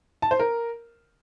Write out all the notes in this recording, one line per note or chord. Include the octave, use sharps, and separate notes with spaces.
A5
C5
A#4